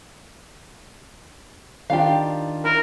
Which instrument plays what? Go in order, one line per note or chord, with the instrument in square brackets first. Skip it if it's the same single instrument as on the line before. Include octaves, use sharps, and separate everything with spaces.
[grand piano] D#3 D4 F4 [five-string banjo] G4 F5
[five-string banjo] E4 [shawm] A#4